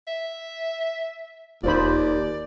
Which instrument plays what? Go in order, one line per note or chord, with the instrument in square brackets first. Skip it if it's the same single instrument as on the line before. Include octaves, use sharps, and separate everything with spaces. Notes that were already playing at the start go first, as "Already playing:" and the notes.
[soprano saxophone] E5
[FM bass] E1 [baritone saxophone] D#2 [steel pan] F4 C5 B5 [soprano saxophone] D5